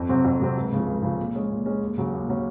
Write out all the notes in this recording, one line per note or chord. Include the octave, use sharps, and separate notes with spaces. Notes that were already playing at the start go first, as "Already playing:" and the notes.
Already playing: F2
C3 F#3 C4 F#4
F2
C3 F#3 C4 F#4
C#2
C#3 F3
C#2
C#3 F3
A#2
G#3 C#4 G#4
A#2
G#3 C#4 G#4
D#2
C#3 F#3 C#4
D#2
C#3 F#3 C#4